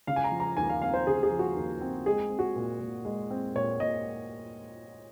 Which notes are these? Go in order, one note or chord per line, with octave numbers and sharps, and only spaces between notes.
C#3 F5
G#5
A#5
F3
A#5
D#2 G#5
F5
C4 F5
C5
C#3 G#4
G#4
F3
F#4
D#2
C4
G#3 G#4
C4
F#4
A#2
A#2
G#3
C4
A#2 C#5
A#2 D#5